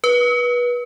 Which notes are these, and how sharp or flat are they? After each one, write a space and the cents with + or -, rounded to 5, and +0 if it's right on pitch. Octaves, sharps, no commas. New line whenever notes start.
B4 -25